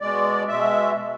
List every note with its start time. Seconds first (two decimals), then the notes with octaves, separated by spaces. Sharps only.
0.01 B2 G#3 D5
0.48 B2 G#3 E5